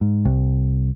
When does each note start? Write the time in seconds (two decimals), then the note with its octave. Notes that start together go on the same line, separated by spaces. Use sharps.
0.01 G#2
0.25 C2